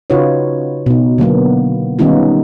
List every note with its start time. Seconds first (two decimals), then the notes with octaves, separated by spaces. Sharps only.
0.10 C#3 D#4 F4 F#4 B4 C#5
0.86 B2 D#4
1.18 D3 F#3 A#3 B3
1.99 D#3 G3 B3 C#4 D#4 F4